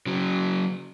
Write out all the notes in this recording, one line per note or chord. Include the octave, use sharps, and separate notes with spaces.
C#3 F#3